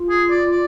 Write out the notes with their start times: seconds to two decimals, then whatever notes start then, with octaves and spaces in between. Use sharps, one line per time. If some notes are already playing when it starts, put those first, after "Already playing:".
Already playing: F4
0.10 G#4
0.31 D5
0.51 D5